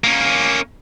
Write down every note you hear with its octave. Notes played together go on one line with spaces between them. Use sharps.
A#3 C#4